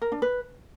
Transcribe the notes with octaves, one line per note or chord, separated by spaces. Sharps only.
A#4
D4
B4